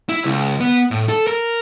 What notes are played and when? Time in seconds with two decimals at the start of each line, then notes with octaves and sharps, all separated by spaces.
0.09 E4
0.24 C#2
0.60 B3
0.91 A2
1.09 A4
1.27 A#4